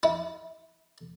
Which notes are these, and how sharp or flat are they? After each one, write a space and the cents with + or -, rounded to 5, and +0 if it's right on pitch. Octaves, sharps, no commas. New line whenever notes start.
E4 -30